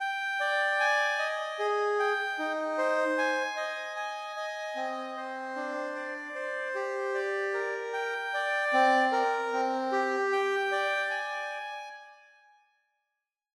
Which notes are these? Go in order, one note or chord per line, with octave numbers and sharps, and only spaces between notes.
G5
D5
G#5
D#5
G#4
G5
D#4
C5
G#5
D#5
G#5
D#5
C4
C5
D4
D5
C5
G4
D5
A#4
G5
D5
C4
A#4
C4
G4
G5
D5
G#5